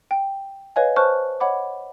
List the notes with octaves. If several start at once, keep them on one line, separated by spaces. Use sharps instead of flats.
G5
B4 C#5 D#5 F5 G#5
C5 A5 C#6 F6 F#6
C#5 D#5 F#5 B5 D6